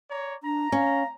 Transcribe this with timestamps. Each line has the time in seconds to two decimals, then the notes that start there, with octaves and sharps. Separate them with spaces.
0.10 C#5 D5 A#5
0.43 D4 A#5
0.72 C#4 F5